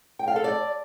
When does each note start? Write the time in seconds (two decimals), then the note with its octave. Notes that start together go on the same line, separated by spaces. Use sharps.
0.19 G5
0.28 F5
0.36 A4
0.44 D5